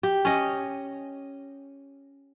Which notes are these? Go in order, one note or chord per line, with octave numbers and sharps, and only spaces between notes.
G4
C#4 D#5